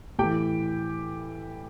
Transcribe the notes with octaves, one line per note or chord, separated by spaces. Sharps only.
A2 E3 G4 G5